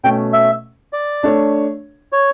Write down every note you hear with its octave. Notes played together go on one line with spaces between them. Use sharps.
B2 A3 C#4 G5
E5
D5
A3 D4 A4 C#5
C#5